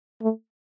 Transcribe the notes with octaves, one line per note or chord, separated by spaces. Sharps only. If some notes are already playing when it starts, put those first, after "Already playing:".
A3